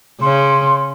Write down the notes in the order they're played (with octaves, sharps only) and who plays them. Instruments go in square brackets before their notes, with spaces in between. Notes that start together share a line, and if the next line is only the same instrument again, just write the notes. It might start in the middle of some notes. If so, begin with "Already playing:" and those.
[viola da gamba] C#3 C#4 [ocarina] C6